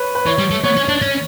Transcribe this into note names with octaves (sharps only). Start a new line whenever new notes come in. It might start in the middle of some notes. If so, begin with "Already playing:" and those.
Already playing: B4 C#5
B4
E3 C#5
G3
A3
B3 C#5
C#4
D4
C#4